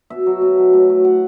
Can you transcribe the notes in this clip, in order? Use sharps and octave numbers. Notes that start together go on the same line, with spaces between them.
B2 E5
F#3
B2
F#3
A2
F#3
F#5